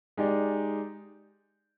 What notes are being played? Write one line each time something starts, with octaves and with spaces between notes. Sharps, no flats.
G#3 D#4 G4 D5